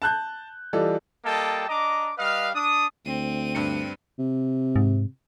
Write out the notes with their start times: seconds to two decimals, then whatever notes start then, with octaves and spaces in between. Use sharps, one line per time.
0.02 A5 F#6 G6
0.73 E3 G3 F4 A4 D5 D#5
1.25 G3 A#3 A4 D#5 G5 A5
1.69 D4 D#5 A#5 D6
2.18 G3 B4 D#5 F5
2.55 D4 D#6
3.06 D2 C4 D#7
3.55 G2 D4 C#7
4.19 C3
4.76 G#2